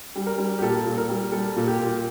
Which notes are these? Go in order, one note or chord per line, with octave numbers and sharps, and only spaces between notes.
G3
A#4
G3
G4
A#2 A4
A#2
A#4
G3
G3 A4
A#2
G4
A#2